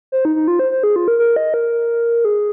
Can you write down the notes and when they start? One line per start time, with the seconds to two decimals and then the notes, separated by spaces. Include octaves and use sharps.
0.12 C5
0.25 D#4
0.36 D#4
0.48 F4
0.59 C5
0.71 C5
0.83 G#4
0.96 F4
1.08 A#4
1.19 A#4
1.36 D#5
1.54 A#4
2.25 G#4